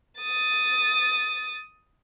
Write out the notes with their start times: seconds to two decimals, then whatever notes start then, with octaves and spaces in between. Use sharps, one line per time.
0.21 D#6 A6